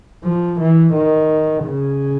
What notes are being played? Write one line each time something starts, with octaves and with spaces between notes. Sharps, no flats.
F3
E3
D#3
C#3